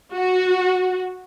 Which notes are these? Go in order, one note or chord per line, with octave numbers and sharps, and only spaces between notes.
F#4